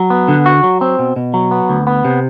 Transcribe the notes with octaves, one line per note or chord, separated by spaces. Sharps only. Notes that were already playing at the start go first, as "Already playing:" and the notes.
Already playing: F#3
B3
D3
F#4
F#3
C4
B2
B2
F#3
B3
D2
B3
C3